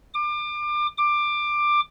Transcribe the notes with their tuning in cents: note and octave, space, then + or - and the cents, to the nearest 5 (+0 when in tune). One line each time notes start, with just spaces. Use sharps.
D6 +30
D6 +15